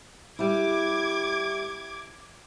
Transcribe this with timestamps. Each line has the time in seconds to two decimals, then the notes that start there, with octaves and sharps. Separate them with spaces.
0.39 G3 E4 D6 G#6